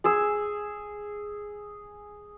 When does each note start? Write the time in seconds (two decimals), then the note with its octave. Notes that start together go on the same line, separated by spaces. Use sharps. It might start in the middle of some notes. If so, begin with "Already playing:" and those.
0.04 G#4 G#5 E6